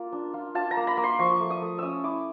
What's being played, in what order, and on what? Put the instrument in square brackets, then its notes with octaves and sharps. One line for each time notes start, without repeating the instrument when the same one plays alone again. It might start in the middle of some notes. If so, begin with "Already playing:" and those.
Already playing: [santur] A#3 F4
D4
F4
F4 A5
A#5
A#3
B5
A#3
C6
F3 C#6
A3
D#6
A3
C#4 D#6 E6
E4 D6